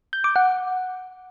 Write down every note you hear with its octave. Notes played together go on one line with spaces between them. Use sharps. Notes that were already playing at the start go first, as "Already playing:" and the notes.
G6
D6
F#5